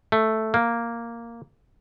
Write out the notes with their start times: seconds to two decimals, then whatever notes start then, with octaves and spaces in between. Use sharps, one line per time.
0.12 A3
0.54 A#3